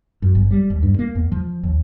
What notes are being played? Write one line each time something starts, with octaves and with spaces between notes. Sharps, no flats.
F#2
G1
G3
D#2
G2
A#3
E2
F3
D#2